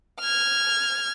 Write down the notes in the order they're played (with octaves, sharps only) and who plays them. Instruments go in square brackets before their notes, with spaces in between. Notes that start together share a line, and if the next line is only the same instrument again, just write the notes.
[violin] F6 G#6